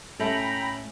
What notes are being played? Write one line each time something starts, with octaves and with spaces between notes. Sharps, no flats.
A2 A3 C#4 A4 E5 G5 A#5 B5